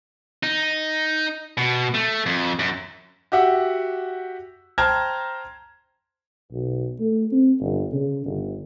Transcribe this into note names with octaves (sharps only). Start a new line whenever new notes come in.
D#4
B2
A3
F2
F#2
F#4 G4 E5 F#5
C5 G5 A5 A#5 F6 G#6
B1
A3
C4
G1
C#3
G1